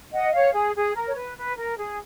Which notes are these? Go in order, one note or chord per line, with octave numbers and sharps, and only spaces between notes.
D#5 F#5
C#5 F5
G#4
G#4
A#4
C#5
B4
B4
A#4
G#4